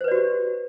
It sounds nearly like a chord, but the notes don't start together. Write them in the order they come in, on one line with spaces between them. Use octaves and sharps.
C5 B4 D5 F#4 G4